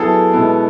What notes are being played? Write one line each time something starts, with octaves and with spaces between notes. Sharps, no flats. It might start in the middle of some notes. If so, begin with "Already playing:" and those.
Already playing: F#3 B3 E4 G#4 A4
B2 G#3 B3 E4